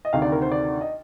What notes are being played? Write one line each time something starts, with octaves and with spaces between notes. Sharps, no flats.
D#5
D2 C3 D#3 F5
D5
A#4
C5
D5
D#5